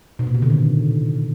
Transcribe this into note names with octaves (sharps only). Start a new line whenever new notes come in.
B2
A#2
C3
D3
D#3